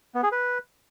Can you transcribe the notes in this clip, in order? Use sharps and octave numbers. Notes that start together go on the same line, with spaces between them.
B3
G#4
B4